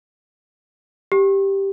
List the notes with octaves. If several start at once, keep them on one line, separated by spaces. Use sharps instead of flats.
G4